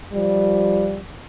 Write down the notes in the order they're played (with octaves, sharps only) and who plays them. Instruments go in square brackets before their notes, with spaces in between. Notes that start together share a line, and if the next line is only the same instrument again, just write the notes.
[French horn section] F3 G3